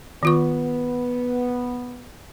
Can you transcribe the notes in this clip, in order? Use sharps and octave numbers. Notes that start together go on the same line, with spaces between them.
D#3 B3 F4 C#6